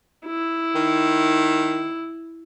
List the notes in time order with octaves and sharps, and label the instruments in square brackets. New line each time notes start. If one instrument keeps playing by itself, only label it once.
[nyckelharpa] E4
[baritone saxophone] D#3